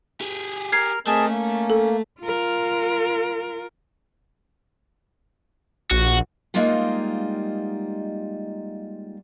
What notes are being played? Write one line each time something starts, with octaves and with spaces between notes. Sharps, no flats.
G4 G#4
A#4 F6 G#6 C7
A3 C4 G#4 A#4 D#5 A5
A#3 C#4
A4
F4 A#4
A#1 F#4
G3 G#3 A#3 D#4 F4 F#5